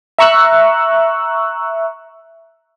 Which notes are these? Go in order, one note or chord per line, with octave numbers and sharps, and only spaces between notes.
E5 A#5 C#6 E6 F#6